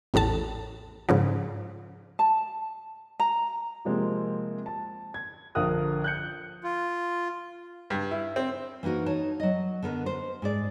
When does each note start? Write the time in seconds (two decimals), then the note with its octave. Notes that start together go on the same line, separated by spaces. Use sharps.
0.14 A1 E2 A2 A5
1.09 G#2 C#3 F3
2.19 A5
3.20 A#5
3.85 C3 F3 G#3 A#3 C4
4.66 A5
5.14 G#6
5.55 A#1 D3 A#4 F5 D#6 F#6
6.04 F#6 G6 C#7
6.64 F4
7.90 G2
8.11 E4
8.36 C4
8.83 E3 A#3 D#4 F#4 A#4
9.06 D#4 C#5 A5
9.40 F#3 D#5
9.83 D3 B3 A#4 B4
10.06 C5
10.42 G#2 G#4 D5